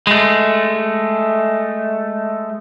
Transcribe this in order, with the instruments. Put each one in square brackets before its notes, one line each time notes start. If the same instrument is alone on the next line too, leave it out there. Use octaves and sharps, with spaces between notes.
[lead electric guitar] G#3 A3